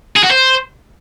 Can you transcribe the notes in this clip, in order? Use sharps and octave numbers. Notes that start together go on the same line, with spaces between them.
G#4
F#4
C5